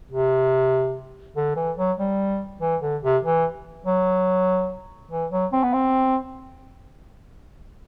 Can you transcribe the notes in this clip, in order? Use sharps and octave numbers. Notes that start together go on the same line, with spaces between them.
C3
D3
E3
F#3
G3
E3
D3
C3
E3
F#3
E3
F#3
C4
B3
C4